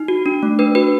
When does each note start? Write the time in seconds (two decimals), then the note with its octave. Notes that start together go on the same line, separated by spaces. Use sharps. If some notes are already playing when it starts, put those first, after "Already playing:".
Already playing: D#4
0.08 F#4
0.26 D4
0.43 A3
0.59 D4 B4
0.75 F#4 B4